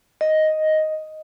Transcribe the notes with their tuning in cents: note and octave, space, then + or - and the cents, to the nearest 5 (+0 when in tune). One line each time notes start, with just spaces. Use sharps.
D#5 +5